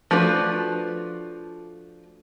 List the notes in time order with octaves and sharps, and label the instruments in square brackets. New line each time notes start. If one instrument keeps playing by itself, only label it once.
[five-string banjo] F3 A3 D4 F#4 B4